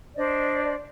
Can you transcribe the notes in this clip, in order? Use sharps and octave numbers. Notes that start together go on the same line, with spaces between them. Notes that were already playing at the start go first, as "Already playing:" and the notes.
D4 C5 D5 D#5